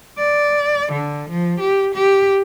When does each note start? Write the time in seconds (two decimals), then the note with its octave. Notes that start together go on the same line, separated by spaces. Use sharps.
0.19 D5
0.92 D3
1.30 F3
1.60 G4
1.95 G4